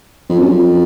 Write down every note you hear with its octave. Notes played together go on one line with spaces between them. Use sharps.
F2
F#2
F2